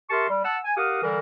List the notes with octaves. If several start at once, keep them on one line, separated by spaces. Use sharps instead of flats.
G4 A#4 E5 A5 C6 C#6
G3
F#5 A5 E6
G#5
G4 A#4 F5 F#5 D#6
D3 E3 G3 A#4